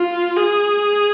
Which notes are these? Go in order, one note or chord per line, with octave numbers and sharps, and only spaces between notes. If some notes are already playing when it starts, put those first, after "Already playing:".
Already playing: F4
G#4